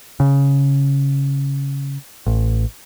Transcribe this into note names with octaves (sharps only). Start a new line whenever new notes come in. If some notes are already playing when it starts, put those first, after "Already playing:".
C#3
A1